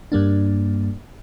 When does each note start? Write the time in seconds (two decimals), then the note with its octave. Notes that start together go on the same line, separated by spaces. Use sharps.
0.12 G2 G3 A#3 D4